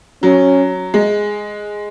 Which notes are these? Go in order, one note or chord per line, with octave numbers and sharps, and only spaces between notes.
F#3 C#4
G#3